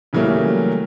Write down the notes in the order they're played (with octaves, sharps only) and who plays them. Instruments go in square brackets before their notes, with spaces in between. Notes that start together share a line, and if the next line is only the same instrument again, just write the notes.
[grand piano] C#3 E3 F#3 G3 A3 A#3